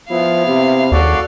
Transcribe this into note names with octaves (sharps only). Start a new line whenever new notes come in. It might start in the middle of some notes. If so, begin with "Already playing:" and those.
F3 B3 E4 F5
C3
F#1 D#2 F#4 A4 D5